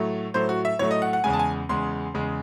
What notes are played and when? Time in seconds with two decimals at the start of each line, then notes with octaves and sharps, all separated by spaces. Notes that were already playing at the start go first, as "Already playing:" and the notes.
Already playing: A2 F#3 A3
0.34 A2 F#3 A3 C5
0.49 F#4
0.65 E5
0.79 A2 F#3 A3 C#5
0.91 D#5
1.02 F#5
1.13 F#5
1.24 E2 C#3 G#3 G#5
1.33 A5
1.39 G#5
1.69 E2 C#3 G#3 C6
2.14 E2 C#3 G#3